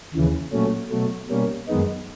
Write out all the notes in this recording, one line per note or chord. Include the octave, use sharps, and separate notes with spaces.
D#2 C#3 E3
A#2 F#3 A3 C#4
B2 F#3 A3
B2 G3 A#3 C#4
F#2 D#3 G#3 B3 D#4